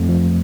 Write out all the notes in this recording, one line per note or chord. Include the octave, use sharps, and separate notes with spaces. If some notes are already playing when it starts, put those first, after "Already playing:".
Already playing: F2 A3
F3